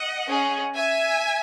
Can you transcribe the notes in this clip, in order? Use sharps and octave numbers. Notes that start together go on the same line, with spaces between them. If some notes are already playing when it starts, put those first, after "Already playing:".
Already playing: D#5 F#5
C#4 G#4
E5 G#5